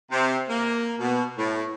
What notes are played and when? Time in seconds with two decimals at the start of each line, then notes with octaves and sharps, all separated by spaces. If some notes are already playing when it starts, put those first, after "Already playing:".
0.11 C3
0.49 A#3
0.99 B2
1.36 A2